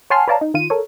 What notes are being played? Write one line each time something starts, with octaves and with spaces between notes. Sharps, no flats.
C#5 F#5 G#5 A5 C6 F6
B4 C#5 D5 F5 A5 A#5
D#4
D#3 F4 D#7
A4 A#4 C#5